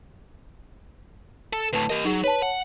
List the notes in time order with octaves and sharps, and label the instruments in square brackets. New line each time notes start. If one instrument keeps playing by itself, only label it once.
[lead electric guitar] A4
[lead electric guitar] D2 A2 [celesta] B4 A5
[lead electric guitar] G4 D#5 [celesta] A#4
[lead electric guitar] F#3 [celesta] D#4 G#4
[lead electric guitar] B4 [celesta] C#5 A5
[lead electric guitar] F#5